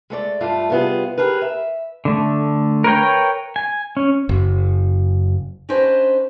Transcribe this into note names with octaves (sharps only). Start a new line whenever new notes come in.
G#3 A3 D5
G2 A3 F4
C3 G3 B3 F4 G#4
G4 G#4 A#4 B4
E5
D3 A3
A#4 B4 C#5 G5
G#5
C#4
F#1
C#4 D4 G4 B4 C5 D#5